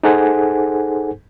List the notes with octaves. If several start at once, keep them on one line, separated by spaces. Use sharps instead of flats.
D#4 G#4 A4 C5 F#5 G#5